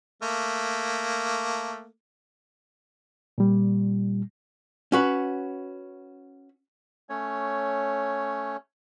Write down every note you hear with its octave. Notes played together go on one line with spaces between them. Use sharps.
A3 A#3
A#2 G3
C#4 F#4 B4
A3 C#4 C#5